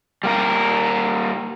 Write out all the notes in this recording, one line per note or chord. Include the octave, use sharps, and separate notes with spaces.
G3 A#3 A#4